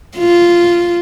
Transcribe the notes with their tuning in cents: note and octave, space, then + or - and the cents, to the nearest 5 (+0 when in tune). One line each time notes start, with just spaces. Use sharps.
F4 -10